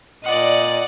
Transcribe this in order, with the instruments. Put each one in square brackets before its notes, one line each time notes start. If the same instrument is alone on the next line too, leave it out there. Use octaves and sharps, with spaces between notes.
[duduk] A#2 [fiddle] D5 F#5 [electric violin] D#5